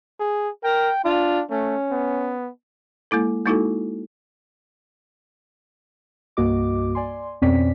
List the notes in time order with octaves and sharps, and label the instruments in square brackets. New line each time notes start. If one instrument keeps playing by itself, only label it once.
[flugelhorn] G#4
[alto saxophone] A#4 [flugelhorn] G5
[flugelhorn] D4 [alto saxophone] F4
[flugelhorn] A3 [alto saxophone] C#4
[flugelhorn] B3
[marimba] G#3 A#3 E4 A4
G#3 A#3 D#4 E4 F#4 A4
[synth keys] C2 G2 A#3 F#4 D#5 D6
D5 G#5 C6
F2 B2 C4 C#4 D5 B6